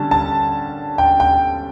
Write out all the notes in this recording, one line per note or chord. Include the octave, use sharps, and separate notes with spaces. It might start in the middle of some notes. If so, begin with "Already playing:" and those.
Already playing: D3 G3 C#4 A5
A5
G5
G5